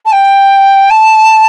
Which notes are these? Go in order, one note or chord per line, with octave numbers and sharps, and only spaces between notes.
A5
G5
A5